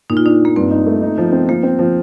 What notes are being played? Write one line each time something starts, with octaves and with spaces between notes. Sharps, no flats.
A#2 D#4
F4
D4 D#4
A#3 D4
G2 C4
D#4
A3
D#4
F3
C4
F3 A#3
C4
F3